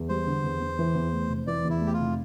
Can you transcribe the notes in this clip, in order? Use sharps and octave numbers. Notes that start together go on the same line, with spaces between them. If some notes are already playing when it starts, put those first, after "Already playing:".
Already playing: E2
G3 C5
D3
E2
E2
E3
E2
A3
F1
E3 D5
E2
E4
A3
G4
F4
F1